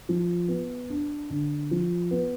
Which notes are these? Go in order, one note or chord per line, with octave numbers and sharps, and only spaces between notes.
F3
B3
D4
D3
F3
B3